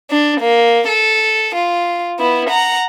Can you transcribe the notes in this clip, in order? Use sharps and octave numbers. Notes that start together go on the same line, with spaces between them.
D4
A#3
A4
F4
B3 E4
F#5 A#5